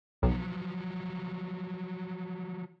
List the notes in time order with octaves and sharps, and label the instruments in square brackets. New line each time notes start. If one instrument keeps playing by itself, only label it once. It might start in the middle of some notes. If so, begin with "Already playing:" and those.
[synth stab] B1 [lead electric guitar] F3 F#3